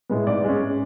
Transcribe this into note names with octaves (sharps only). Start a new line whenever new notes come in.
A2 G#3 B3
G#2 D5
G#3 C#4